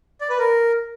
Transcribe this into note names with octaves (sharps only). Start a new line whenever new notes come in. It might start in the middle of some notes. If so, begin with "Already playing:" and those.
D5
B4
A#4